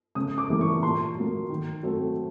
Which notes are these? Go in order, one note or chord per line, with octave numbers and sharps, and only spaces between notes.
C#3 D#6
D6
E3 G3 A#3
C#6
A#2 C6
F#3 A#3
D#3
F#3 A3 C4